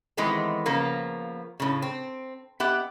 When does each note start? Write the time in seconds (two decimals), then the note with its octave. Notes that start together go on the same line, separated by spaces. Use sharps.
0.17 D#3 E3 G#3 A3 B3 C4
0.66 C#3 F3 A#3 B3
1.60 A2 C#3
1.82 C4
2.60 B3 G4 E5 F#5